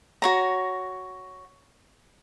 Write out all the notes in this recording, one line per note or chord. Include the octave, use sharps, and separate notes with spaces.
F#4 C#5 A#5